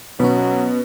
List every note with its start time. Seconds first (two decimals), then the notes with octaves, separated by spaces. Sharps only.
0.20 B2 F#3 C#4 B4